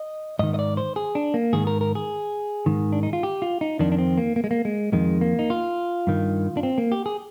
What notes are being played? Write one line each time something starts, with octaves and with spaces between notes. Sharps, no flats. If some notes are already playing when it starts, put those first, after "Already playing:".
Already playing: D#5
G#2 D#3 D#5
D#5
D5
C5
G#4
D4
A#3
G#2 D#3 G#4
A#4
A#4
G#4
G#2 D#3
D4
D#4
F4
G4
F4
D#4
F2 D#3 D4
D4
C4
A#3
A#3
G#3
A#3
G#3
F2 D#3 G#3
A#3
D#4
F4
G2 D#3
D4
C4
A#3
G4
G#4